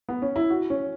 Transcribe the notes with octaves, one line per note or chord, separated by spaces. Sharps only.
B3
C#4
E4
F#4
C#4